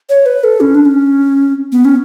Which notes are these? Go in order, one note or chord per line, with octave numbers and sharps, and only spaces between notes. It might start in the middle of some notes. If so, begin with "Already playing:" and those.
C#5
B4
A4
C#4
D4
C#4
B3
C#4